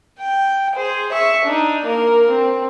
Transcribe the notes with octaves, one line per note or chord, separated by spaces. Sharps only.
G5
G#4 C5
E5 C#6
D4 D#4
A#3 A#4
C4